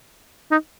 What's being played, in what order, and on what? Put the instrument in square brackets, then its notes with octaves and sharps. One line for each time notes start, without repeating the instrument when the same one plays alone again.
[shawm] D#4